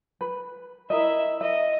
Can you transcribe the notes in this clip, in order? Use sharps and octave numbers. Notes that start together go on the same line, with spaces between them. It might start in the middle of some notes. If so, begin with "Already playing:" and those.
B4
E4 A#4 D#5 E5
D#5 E5